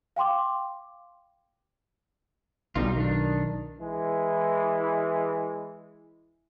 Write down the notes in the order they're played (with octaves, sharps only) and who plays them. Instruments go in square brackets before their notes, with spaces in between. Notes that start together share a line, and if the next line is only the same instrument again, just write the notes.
[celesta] F5 G5 C6 D6
[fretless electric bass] B1 [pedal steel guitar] G3 D#4 F4
[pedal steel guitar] D#3 D4
[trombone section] E3 G#3 E4